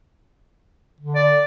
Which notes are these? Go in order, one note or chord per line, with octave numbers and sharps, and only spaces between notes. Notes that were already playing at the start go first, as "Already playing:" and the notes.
D3
D5